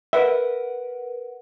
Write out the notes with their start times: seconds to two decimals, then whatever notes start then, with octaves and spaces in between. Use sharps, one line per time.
0.13 A#4 B4 E5 F#5